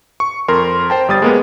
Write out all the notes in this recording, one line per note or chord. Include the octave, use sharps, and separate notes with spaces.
C#6
F2 A#4 C6
C5 G5 A5
G1 G3 D#6 A6
G#3 A#3 B3